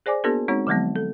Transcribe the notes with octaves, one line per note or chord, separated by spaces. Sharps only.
G#4 C5 D5 G#5 D6
A#3 B3 D4 F#4 G#4 A#4
G#3 C4 D#4 F#4 C#5
D3 F3 F#3 G#3 B3
A4